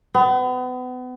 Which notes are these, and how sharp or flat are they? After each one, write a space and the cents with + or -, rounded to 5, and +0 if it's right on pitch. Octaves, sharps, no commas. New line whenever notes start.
B3 +35